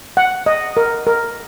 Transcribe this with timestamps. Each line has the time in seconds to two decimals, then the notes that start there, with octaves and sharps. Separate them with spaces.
0.17 F#5
0.46 D#5
0.77 A#4
1.07 A#4